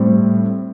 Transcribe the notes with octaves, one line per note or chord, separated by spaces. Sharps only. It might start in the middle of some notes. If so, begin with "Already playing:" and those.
Already playing: A2 G3 C4